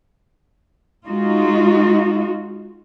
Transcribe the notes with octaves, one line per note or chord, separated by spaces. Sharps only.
G#3 D#4 F4 F#4